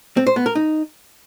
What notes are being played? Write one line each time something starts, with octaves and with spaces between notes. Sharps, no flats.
C4
C5
B3
A#4
D#4